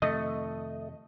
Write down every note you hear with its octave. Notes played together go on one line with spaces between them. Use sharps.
F2 C3 D#3 A3 D#5